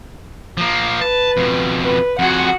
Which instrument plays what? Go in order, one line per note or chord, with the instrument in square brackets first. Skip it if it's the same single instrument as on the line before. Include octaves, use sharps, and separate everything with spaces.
[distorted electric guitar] F3 A#3
[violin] B4 [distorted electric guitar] A5
[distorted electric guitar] F2 B2
[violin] B4
[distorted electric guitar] F2 G#4 [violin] F#4 F#5